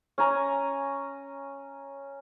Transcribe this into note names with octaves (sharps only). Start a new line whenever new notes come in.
C#4 G#5 A#5